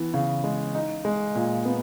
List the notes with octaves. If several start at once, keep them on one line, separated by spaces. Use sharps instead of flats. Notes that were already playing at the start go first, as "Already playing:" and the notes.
Already playing: E3 B3
C#3
G#3
D#4
G#3
A#2
B3